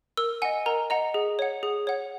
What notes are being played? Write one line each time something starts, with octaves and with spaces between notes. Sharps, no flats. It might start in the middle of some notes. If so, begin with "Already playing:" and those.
A#4 E6
D#5 F#5 G#5
A#4 A#5
D#5 F#5 A#5
G#4
C#5 F#5
G#4
C#5 F#5